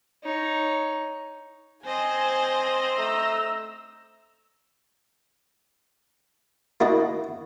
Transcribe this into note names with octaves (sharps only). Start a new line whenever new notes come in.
D#4 C#5
C4 C5 D#5 G#5
A3 A#5 E6
A#3 D4 E4 F#4 D#5 A5